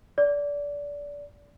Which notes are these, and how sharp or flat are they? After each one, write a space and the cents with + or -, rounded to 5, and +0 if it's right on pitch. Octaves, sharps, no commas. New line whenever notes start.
D5 -25